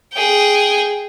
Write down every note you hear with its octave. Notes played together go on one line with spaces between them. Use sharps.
G#4 G5